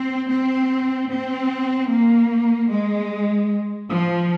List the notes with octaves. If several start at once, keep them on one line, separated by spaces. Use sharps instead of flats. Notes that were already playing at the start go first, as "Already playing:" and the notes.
Already playing: C4
C4
C4
A#3
G#3
F3